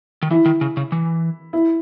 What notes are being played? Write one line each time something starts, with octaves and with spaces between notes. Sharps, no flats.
D#3
E3 E4
D#3
C#3
C#3
E3
E4